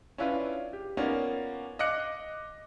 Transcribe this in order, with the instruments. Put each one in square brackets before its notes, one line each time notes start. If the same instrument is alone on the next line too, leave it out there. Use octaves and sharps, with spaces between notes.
[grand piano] C#4 D4 E4 F4 B4
G4
A#3 B3 C#4 D#4 F4 D5
D#5 F5 D6 F#6 C#7